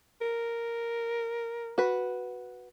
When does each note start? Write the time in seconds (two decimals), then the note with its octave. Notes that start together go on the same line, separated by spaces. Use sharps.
0.21 A#4
1.78 F#4 B4